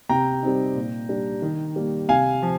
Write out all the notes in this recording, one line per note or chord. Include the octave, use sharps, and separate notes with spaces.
C3 G5 A#5
G3 C4 D#4
A#2
G3 D4
D#3
G3 A#3
C3 F5 G#5
F3